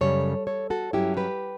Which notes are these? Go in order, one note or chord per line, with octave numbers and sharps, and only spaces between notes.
F#2 C#3 G3 A4 C#5
A4 C#5
F#4 A4
G2 F#3 C#4 E4 G4
G4 B4